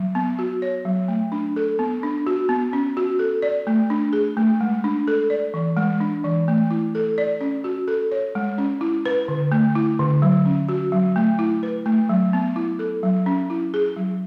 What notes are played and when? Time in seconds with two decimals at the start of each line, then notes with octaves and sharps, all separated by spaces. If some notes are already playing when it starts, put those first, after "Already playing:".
Already playing: F#3
0.15 B3
0.39 F#4
0.62 C#5
0.85 F#3
1.08 A3
1.32 D4
1.56 A4
1.79 B3
2.03 D4
2.27 F#4
2.49 B3
2.73 C#4
2.97 F#4
3.19 A4
3.42 D5
3.67 A3
3.90 D4
4.13 G#4
4.37 A3
4.61 G#3
4.84 D4
5.08 A4
5.30 D5
5.54 E3
5.77 G#3
6.00 D4
6.24 E3
6.48 A3
6.71 E4
6.95 A4
7.18 D5
7.41 C#4
7.64 F#4
7.88 A4
8.12 C#5
8.35 G#3
8.58 C#4
8.81 E4
9.06 B4
9.28 D3
9.52 A3
9.75 E4
9.99 D3
10.22 F#3
10.45 C#4
10.69 F#4
10.92 F#3
11.16 A3
11.39 E4
11.63 B4
11.86 A3
12.09 F#3
12.33 B3
12.56 E4
12.79 A4
13.03 F#3
13.26 C#4
13.50 E4
13.74 G#4
13.96 F#3